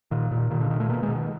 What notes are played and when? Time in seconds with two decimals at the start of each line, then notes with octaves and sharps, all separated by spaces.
0.11 A#2 D#3
0.31 A#2
0.38 D#3
0.50 A#2 D#3
0.60 D3
0.70 A#2 D#3
0.80 A3
0.89 B2 A#3
1.03 G#3
1.08 B2
1.15 D#3